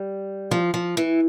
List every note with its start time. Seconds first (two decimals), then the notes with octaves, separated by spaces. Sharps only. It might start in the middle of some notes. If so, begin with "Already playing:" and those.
Already playing: G3
0.51 F3
0.74 F3
0.97 E3